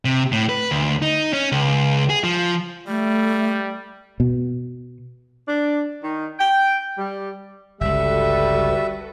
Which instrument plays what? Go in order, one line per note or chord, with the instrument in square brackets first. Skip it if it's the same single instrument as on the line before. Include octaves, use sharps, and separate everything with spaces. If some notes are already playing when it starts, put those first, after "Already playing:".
[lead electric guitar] C3
A2
B4
D2
D#4
C#4
C#2
G#4
F3
[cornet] G3 [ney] A3
[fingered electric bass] B2
[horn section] D4
D#3
G5
G3
[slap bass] G1 C#2 [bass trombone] G3 [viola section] F#4 A4 B4 [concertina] E5